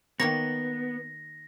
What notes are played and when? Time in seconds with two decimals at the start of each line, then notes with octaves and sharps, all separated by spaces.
0.20 D#3 A#3 B3 C#5 A#6